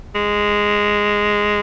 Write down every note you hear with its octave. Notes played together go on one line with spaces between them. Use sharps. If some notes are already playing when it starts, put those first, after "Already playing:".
G#3